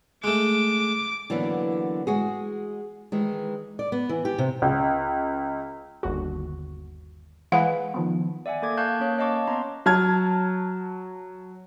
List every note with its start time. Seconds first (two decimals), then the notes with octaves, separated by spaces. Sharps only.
0.24 G#3 A3 D6
1.30 D3 E3 F#3 A#3 B3
2.07 G#3 F#4 G#4
3.12 D#3 E3 G#3
3.79 D5
3.92 B3
4.09 E3
4.25 G4
4.38 C3
4.62 C#2
6.03 G1 D#2 F#4
7.52 E3 G#3 B4 F5 F#5
7.94 D#3 F3 B3
8.46 D5 E5 F#5 G#5
8.62 A#3 A4 D6 G#6
8.77 F5 A5 C#6 F#6 G6
9.00 A#3 C#4 C#5 F#6
9.18 C#5 D#5 F5 A5 C#6 D6
9.47 B3 C#4 A#5 C6
9.86 F#3 A5 F6 G#6